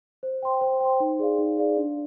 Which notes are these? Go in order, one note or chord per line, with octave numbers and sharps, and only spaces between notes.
C5
G5 C6
C5
G5 C6
D#4
G#4 D5 F5
D#4
G#4 D5 F5
D4